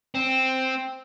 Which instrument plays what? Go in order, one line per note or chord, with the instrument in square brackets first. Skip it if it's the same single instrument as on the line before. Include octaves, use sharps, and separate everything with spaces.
[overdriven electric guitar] C4